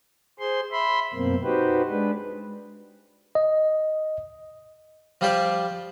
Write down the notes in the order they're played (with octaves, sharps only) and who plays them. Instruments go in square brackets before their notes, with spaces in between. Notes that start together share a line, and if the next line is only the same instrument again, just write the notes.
[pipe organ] G#4 C5 C6
E5 B5 C6
F#2 B2 A#3 C4
D#4 F#4 G4 B4 C5
G#3 D4 B4
[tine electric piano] D#5
[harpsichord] F3 G3 F4 G4 C5 D5